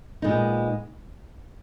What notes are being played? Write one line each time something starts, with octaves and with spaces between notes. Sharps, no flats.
A#2 G#3 B3 D#4